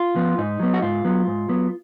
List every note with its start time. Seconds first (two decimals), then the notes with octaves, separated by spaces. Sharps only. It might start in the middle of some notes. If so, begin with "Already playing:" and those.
Already playing: F4
0.15 F3 B3
0.38 G#2 D#4
0.60 F#3 B3
0.74 F#4
0.82 G#2 F4
1.05 F#3 B3
1.27 G#2
1.49 F#3 B3